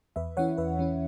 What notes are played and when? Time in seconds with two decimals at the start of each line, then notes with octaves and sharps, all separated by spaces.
0.16 E2 B4 E5
0.37 E3 C#4 E4 C#5 F#5
0.58 E2 B4 E5
0.79 E3 C#4 E4